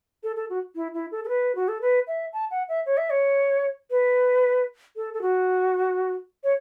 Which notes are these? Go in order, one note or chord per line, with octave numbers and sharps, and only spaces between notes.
A4
A4
F#4
E4
E4
A4
A4
B4
F#4
A4
B4
E5
A5
F#5
E5
C#5
E5
C#5
B4
A4
A4
F#4
C#5